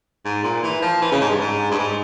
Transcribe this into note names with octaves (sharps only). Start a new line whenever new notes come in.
G#2
A#2
E3
F3
E3
C#3
G#2
G2
G#2
G2
G#2